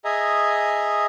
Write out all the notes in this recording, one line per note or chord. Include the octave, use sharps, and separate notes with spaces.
G#4 D#5 E5 G#5 A#5